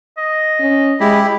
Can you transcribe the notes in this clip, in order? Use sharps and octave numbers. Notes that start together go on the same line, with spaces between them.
D#5
C#4
G#3 E4 G4 B5